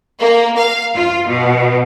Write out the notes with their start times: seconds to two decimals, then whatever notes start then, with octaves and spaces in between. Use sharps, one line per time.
0.19 A#3
0.57 F5
0.96 F4
1.28 B2